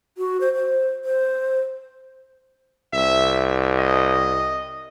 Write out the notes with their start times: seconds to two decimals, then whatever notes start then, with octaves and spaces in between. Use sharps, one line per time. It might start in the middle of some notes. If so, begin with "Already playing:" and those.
0.18 F#4
0.41 C5
0.54 C5
1.05 C5
2.93 C2 E5
3.79 D#5